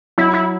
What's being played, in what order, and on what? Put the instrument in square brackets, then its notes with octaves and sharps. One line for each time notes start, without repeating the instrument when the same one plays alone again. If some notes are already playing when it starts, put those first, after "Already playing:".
[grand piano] F#3 [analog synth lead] E4
[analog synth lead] E4